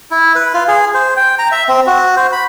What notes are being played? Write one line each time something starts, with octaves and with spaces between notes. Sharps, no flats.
E4
B4
F4
G#4
C5
G5
A#5
E5
C4
F#4
C5
B5